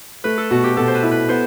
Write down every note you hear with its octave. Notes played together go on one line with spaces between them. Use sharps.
A3 B4
A4
B2 F#4
G4
B2 A4
C5
B4
E4
B4
B3 C5